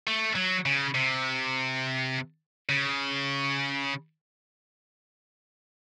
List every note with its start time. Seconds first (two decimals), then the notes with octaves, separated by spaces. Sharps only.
0.07 A3
0.36 F#3
0.66 C#3
0.95 C3
2.69 C#3